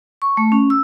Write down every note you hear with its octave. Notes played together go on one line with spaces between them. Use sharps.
C#6
A3
C#4
E6